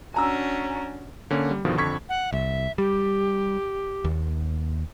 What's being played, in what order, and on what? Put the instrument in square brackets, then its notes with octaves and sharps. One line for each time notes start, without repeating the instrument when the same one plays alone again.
[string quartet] C#4 D4 F#4 [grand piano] G#5 A#5 E6
[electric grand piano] D3 A#3 C#4
G3
G2 B2 D3 D#3 F3
F2 D3 C#6 G#6 B6
[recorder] F#5
[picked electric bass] C2 [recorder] E5
[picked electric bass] G3 [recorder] G4
[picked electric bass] D#2